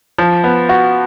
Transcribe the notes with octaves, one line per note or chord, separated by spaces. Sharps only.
F3
B3
F#4